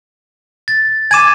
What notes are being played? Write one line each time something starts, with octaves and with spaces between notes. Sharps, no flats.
A6
G#5 D6 G#6 D#7 E7